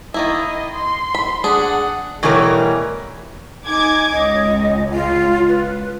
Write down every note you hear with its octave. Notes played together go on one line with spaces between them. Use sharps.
D#3 A#3 E4 D#5
C6
B5
D4 G#4 F#5
B2 E3 G3 A3 A#4 C#5
D#4 G#5 D6 G#6
C#2 D#5
F4
B4